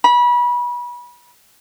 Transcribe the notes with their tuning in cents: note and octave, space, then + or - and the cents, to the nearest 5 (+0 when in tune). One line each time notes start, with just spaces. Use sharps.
B5 -30